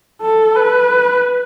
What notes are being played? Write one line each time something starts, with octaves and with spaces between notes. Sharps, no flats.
A4
B4